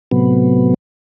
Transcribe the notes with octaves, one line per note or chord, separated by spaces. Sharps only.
A2 C3 F#3 B3